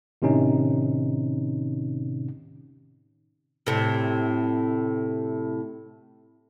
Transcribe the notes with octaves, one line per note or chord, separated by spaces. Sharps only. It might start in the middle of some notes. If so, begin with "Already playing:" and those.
A2 C3 D#3 C#4 D#4
A2 C3